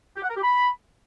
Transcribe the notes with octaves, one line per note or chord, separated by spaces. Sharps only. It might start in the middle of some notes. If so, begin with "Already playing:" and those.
G4
F#5
A#4
G4
B5